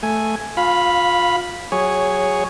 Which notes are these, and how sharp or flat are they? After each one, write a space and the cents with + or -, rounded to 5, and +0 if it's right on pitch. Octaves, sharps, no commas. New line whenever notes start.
A3 +0 G#5 +0
F4 +25 F5 +0 B5 -5
F#3 +15 G#4 -10 C#5 +0